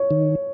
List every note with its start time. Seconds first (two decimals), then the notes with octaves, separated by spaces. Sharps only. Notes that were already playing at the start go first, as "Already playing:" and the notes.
Already playing: C#5
0.11 D#3